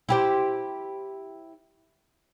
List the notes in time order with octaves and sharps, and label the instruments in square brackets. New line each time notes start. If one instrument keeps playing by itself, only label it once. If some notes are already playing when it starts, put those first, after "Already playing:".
[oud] E4 G4 C5